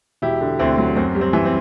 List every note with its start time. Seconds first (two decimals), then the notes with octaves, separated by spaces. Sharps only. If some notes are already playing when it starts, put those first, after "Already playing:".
0.22 E1 E4 G4
0.41 D3
0.59 D2 C4 E4
0.78 F#3
0.96 F#2 C4
1.15 G3
1.21 C4
1.33 E3
1.45 C4